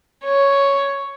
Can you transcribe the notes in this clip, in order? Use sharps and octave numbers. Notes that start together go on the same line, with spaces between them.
C#5